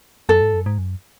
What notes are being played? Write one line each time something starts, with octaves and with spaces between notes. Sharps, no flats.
F#2 A4
G#2
F#2
G#2
F#2